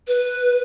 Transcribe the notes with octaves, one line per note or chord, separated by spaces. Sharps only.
B4